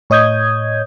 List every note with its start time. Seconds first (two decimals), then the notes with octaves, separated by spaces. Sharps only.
0.10 A2 C#5 D#5 D#6 G6 G#6